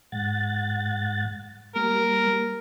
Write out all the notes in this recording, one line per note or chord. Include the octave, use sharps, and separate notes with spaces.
G#2 F#5 A6
G3 A#3 A#4